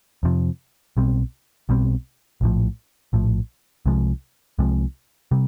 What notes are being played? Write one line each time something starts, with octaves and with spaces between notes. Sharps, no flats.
F2 C3 F3
B1 B2 G3 C4
B1 B2 G3 C4
A#1 A2 F3
A#1 A2 F3
C2 C3 F3 G#3
C2 C3 F3 G#3
C3 G3